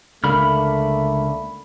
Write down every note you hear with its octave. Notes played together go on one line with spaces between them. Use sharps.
C#2 D3 A3 A#3 B5 F6